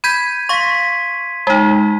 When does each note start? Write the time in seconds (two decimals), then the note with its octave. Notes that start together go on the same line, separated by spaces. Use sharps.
0.04 B5 G6 G#6 B6 D#7
0.49 F5 C6 C#6 B6
1.47 G#3 D#4 A5